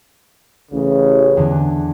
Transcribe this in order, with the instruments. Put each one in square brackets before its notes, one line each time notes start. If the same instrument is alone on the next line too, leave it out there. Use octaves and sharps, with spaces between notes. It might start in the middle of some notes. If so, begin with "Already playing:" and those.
[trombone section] A1 C#3
[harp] E2 D3